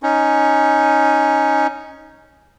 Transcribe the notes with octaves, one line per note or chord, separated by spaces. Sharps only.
C#4 D#4